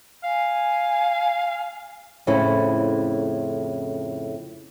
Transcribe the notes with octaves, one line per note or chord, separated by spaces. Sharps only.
F5 G#5
F2 A2 C#3 C#4 E4